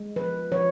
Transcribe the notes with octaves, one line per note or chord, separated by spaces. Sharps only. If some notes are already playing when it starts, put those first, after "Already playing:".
Already playing: G#3
F3 B4
F3 C#5